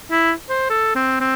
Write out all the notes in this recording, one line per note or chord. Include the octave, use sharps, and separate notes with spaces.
E4
C5
A4
C4
C4